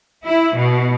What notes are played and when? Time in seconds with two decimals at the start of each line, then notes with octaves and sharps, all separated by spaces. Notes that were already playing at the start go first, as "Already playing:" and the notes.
0.24 E4
0.55 B2